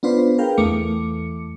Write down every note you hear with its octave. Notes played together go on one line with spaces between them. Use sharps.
B3 D4 F4 B4 C5
G#4 A#4 B4 F5 G5
E2 E3 A3 D6 C#7